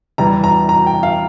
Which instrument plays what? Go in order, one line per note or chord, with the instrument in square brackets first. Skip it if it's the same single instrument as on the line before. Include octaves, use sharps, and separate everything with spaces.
[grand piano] E2 E3 G3 A#5
A#5
A#5
G5
F5